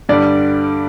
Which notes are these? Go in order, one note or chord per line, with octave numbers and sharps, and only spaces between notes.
G2 D3 G3 D5